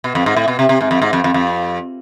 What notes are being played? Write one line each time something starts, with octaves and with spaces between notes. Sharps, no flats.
B2
F2
G#2
A2
B2
C3
C3
G#2
F2
G#2
F2
F2
F2